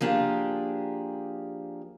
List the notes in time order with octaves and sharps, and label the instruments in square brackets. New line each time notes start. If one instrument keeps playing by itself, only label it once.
[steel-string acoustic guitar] F3 A#3 D4 G4 G#4